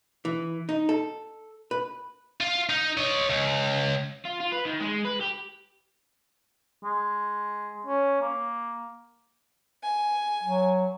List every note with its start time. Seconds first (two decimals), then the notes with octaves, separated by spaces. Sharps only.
0.25 E3
0.69 D#4
0.89 A4
1.71 B4
2.41 F4
2.69 D#4
2.97 C#5 D#5
3.29 C#2
4.25 F4
4.41 F4
4.53 B4
4.66 D#3
4.81 G#3
5.05 B4
5.21 G4
6.84 G#3
7.86 C#4
8.21 A#3
9.83 G#5
10.43 F#3